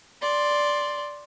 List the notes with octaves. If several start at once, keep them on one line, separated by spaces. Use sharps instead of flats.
D5 C6